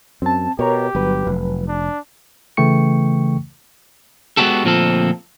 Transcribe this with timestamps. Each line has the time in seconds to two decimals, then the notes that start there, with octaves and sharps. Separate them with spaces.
0.22 F#2 C4 A5
0.59 B2 G4 A#4 C#5 A#5
0.95 G1 F#3 B4
1.27 F1
1.68 D4
2.57 C#3 E3 A3 G5 C#6 C#7
4.37 G#3 A#3 B3 F#4 G4 A4
4.64 D2 A#2 F3 C4 A4